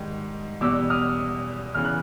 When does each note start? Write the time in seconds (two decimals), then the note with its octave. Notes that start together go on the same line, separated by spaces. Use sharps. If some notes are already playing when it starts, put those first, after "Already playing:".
Already playing: G#2 D#3 G3
0.61 E2 B2 G3 D6 E6
0.90 D#6 F6
1.74 E2 C#3 E3 F6
1.85 F#6